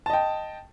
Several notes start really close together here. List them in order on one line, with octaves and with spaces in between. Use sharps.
A5 D#5 G5